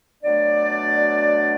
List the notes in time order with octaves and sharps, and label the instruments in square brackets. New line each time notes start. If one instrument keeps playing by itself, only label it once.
[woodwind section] B2 F#3 A3 D4 D5